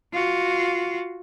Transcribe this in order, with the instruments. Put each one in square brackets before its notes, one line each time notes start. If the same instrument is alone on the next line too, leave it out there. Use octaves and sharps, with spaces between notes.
[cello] F4 F#4